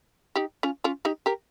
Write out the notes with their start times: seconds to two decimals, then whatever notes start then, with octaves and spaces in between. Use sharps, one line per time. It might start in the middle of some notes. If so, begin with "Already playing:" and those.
0.36 D#4 G4
0.63 C#4 F4
0.84 C#4 F4
1.05 D#4 G4
1.26 G4 A#4